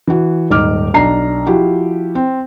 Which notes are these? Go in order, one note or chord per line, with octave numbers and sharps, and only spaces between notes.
E3 F#4
D#1 G#2 D#4 D6 F6
B1 D4 A#5 C7
F3 E4 F#4 G4
C4